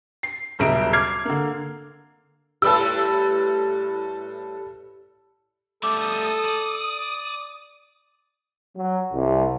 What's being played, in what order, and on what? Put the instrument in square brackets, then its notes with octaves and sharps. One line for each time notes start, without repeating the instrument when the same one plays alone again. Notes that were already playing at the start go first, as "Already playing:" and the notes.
[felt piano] C7
D#1 B1 C#3 E5 A#5 D7
D6 F6 G#6 C7
D3 A#3
[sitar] A2 G3 G4 [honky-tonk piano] A4 B4 E6
[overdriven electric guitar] G3 A3 [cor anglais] A4 [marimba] D6 [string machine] D#6
[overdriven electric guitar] D5
[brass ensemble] F#3
C2